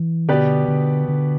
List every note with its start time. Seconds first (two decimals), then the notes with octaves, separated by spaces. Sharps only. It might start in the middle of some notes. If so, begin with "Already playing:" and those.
Already playing: E3
0.28 B2 D3 B3 G4 B4 D5
0.68 D3
1.09 D3